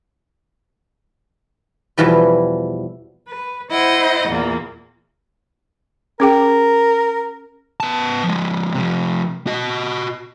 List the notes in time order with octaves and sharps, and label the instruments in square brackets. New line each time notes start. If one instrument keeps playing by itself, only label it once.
[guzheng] E2 B2 E3 F3 G3
[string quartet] B4
E4 C5 D#5 F#5
E2 A#2 A#3
[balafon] C#4 G#4 G5 [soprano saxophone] A#4
[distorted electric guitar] B3 A5
F3 G#3
C3 F3
F#4 D#5